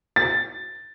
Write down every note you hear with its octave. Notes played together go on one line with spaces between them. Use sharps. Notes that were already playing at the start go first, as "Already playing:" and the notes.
A6